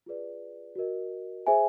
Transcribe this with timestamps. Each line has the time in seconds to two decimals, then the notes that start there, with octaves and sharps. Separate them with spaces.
0.06 F4 G#4 B4 D5
0.76 F#4 A#4 D#5
1.47 G#4 C5 E5 G#5